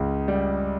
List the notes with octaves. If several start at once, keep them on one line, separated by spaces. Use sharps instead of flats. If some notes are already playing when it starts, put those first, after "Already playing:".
Already playing: C#2 C#3
G3